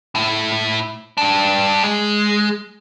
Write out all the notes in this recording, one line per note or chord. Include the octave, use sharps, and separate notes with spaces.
A2 E4
G2 D4
G#3